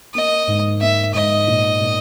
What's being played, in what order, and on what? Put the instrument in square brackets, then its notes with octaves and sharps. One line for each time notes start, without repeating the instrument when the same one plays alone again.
[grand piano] A#3 [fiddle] D#5
[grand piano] G#2
[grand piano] A#3 [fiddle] E5
[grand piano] G#2 [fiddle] D#5
[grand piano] A#2
A#2